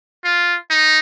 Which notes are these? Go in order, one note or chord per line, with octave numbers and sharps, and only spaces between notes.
F4
D#4